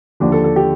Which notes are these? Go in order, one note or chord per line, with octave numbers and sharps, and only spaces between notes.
D#2 D3 F3 D4
A4
A4
G4